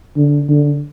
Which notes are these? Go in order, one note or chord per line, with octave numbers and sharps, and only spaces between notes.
D3
D3